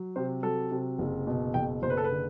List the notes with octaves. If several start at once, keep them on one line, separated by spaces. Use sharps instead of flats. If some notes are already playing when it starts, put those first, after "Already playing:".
Already playing: F#3
C3 C5
F#3 A4
C3
F#1
B2
F#1 G5
F#1 C5
B4
A4
B4
D3